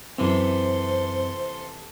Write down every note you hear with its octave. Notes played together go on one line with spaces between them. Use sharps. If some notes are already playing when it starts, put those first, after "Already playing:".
F#2 C3 E3 C4 A4 C5 C6